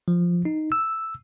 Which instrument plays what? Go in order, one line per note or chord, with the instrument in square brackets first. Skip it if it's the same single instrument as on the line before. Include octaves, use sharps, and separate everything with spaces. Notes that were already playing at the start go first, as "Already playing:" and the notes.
[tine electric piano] F3
D#4
E6